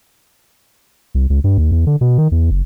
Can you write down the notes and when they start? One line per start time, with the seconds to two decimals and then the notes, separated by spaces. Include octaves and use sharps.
1.15 C2
1.30 C#2
1.44 G2
1.58 D#2
1.72 E2
1.87 D3
2.01 B2
2.18 D#3
2.32 E2
2.51 F#1